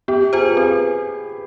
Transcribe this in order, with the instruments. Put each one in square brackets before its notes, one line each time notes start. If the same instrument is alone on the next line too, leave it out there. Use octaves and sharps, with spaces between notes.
[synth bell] B3 [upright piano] G4
[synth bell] F4 C5 [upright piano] G#4
[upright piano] B4
[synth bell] C4 [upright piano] G#4